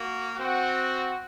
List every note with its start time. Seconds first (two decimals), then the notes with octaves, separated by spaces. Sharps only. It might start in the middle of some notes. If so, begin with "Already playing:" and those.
Already playing: A#3 F#4
0.35 C4 F#4